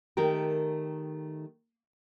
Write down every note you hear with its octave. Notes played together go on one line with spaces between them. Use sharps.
D#3 A3 G4 A#4